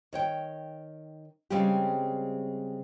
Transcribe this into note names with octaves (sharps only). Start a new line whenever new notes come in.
D#3 C#5 G5
C#3 G3 G#3 C4 G4